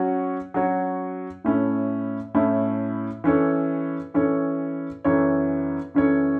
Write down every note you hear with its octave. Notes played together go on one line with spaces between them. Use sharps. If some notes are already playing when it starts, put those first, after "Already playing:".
Already playing: F#3 C#4 F#4 C#5
F#3 C#4 F#4 C#5
A2 A3 C#4 E4
A2 A3 C#4 E4
E3 C#4 A4 C#5
E3 C#4 A4 C#5
F#2 E3 C#4 A4 C#5
F#2 E3 C#4 A4 C#5